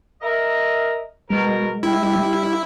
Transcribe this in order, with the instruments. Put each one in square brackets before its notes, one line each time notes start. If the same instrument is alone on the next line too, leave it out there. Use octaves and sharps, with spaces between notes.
[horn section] A#4 D#5 E5
[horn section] B2 A#4 [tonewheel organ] G#3
[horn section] G3 [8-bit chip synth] E4